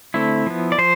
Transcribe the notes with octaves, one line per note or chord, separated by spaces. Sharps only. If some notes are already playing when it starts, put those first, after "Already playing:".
D3 A3 C4 E4
F3 B3
D5
F3 C5